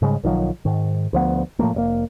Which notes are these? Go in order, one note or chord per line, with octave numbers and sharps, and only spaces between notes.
G#2 C#3 G3 G#3
B1 D#3 F3 F#3
G#2 D#3
D2 F3 B3
A2 F3 A3 A#3
F1 B2 A#3